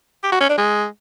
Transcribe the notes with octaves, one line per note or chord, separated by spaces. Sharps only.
G4
F#4
C#4
D4
G#3